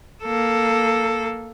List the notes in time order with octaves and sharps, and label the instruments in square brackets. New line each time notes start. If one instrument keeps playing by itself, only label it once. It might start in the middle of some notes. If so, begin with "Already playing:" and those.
[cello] A#3 A4